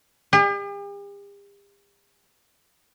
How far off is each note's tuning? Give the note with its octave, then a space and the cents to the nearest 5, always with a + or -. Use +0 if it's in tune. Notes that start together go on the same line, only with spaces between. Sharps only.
G4 +45